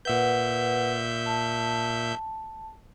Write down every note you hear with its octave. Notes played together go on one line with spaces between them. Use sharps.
A#2 B4 E5 F#5 G6
A5